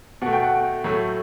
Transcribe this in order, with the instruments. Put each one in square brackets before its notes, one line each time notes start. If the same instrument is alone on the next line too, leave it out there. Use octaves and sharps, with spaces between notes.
[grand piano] B2 A3 F#5
G5
F#5
A2 F#3 A3